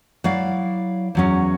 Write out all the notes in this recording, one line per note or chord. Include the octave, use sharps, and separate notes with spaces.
F#3 E4 D5 F5
E2 F#3 C#4